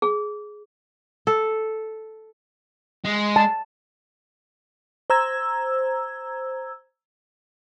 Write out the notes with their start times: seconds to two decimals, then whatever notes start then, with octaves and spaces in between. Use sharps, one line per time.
0.02 G#4
1.27 A4
3.05 G#3
3.36 A5
5.10 C5 A#5 E6 G#6